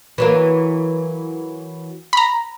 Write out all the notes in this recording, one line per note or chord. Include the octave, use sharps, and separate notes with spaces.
E3 F#3 A#3
A#5 B5